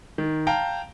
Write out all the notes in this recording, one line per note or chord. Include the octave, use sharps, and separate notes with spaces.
D#3
F5 G5 A5 A#5